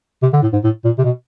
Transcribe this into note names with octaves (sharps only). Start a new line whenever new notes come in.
C3
D3
A2
G#2
A2
A#2
C3
B2